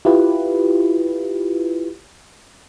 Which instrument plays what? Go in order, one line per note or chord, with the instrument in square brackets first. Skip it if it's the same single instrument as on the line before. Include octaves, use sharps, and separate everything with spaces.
[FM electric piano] E4 F4 G4 B4